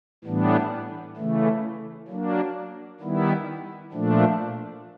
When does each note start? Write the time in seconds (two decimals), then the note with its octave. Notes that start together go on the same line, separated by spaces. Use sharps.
0.24 A2 E3 G3 B3 D4
1.16 C#3 E3 A3
2.08 F#3 A#3 D4
3.00 D#3 G3 B3 E4
3.92 A#2 F3 A3 D4